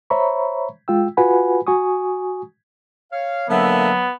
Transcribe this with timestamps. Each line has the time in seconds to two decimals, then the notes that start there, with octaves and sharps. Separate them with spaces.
0.10 C5 C#5 E5 A#5 B5 C#6
0.88 G#3 F4 G5 E6
1.17 F4 F#4 B4 F#5 G#5 B5
1.67 F#4 G#5 C#6 D#6
3.12 C#5 F5
3.50 D3 F#3 A#3 B3 E5